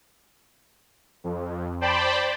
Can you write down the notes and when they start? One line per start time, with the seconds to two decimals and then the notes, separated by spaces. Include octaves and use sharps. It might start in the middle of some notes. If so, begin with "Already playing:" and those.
1.24 F2
1.81 C5 D5 G5 A5 B5